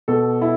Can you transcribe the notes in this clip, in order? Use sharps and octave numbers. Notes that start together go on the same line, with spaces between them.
B2 A4
E4